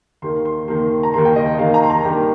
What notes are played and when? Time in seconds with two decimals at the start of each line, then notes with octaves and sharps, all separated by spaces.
0.22 D#2 D#3 A#3 C6
0.45 C6
0.68 D#2 D#3 A#3 C6
1.03 A#5
1.14 D#2 D#3 A#3 C6
1.25 G5
1.36 D#5
1.55 D#5
1.59 D#2 D#3 A#3 F5
1.74 A#5
1.83 C6
1.90 A#5
2.04 G2 D#3 A#3 G4